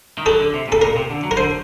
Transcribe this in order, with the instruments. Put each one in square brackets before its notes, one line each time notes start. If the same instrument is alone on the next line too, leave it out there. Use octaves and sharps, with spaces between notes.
[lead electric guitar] D#3
[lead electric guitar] F#3 [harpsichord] A4
[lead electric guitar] D3
C3
[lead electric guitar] A#2 [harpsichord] A4
[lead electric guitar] A#2 [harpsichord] A#4
[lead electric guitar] C3
D3
F#3
[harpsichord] A#4
[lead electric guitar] D3 [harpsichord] C5